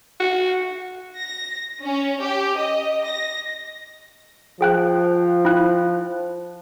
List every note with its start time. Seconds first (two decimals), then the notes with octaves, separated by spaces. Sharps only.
0.20 F#4
1.20 A#6
1.83 C#4
2.22 G4
2.58 D#5
3.07 A#6
4.61 F3 G#4 G5 F#6
5.45 E4 G5 F#6